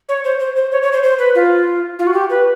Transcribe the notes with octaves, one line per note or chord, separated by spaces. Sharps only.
C#5
C5
C5
C5
C#5
C#5
C5
C5
B4
F4
F4
F#4
G4
B4